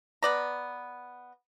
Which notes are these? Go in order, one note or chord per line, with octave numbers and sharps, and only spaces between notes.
B3 D5 A#5